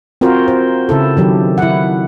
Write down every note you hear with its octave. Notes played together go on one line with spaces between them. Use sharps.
C4 F4 F#4 A#4 C5
C5
C#3 E4 A4
D#3 F#3 G4
E4 F#5